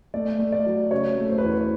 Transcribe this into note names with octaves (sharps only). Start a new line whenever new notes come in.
A3 D5
A3
D5
F#3
C#3 C#5
A3
C5
B4
E2 C5